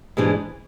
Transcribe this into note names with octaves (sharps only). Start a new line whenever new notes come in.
G#2 E3 G#3 D4 G#4